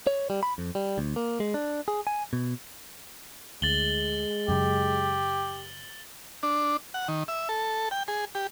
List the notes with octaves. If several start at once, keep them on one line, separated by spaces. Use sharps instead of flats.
C#5
G3
B5
F2
G3
D2
A#3
G#3
D4
G#4
G#5
B2
D2 G#3 A6 F#7 G7
F#2 C#3 G4
D4
F#5
D#3
E5
A4
G5
G#4
G4